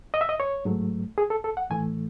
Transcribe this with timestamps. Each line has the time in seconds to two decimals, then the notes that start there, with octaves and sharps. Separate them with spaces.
0.14 D#5
0.21 E5
0.29 D#5
0.40 C#5
0.65 G#2 F#3 A3
1.18 G#4
1.30 A4
1.44 A4
1.57 F#5
1.70 A2 E3 A3 G#5